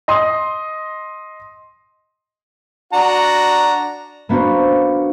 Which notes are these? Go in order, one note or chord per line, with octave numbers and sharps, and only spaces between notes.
D#5 C6 D#6
D4 F#4 A#5
A#3 B3 D4 F#4 C5